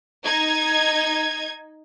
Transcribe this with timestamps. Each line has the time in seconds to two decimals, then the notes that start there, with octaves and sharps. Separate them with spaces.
0.24 D#4 G#6